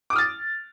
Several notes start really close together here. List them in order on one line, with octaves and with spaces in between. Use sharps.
D6 D#6 F6 A6